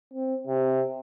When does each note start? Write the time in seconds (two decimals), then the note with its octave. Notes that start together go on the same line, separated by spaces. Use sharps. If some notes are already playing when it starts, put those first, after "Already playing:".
0.13 C4
0.47 C3